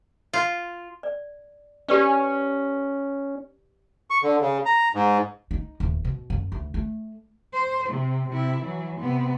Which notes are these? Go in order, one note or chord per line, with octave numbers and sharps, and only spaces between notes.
F4
D5
C#4 G4 B4 D5
C#6
D3
C#3
A#5
G#2
D#4
D#1
B2
F#2
D2
A3
C5
C3
C3 E4
E3 F#3
C3 B3